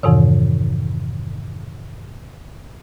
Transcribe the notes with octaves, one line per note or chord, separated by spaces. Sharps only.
F2 G#2 C3 D#3 E3